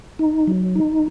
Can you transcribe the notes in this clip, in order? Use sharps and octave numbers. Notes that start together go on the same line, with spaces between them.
D#4
F#3
D#4